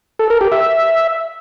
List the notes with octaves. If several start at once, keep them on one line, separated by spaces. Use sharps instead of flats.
A4
A#4
G4
E5